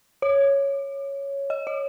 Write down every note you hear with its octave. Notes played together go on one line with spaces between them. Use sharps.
C#5
D#5
C#5